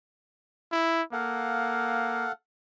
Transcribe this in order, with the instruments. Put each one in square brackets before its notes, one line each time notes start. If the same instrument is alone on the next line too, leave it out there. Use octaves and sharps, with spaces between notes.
[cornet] E4
[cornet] A#3 [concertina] A4 F5 F#5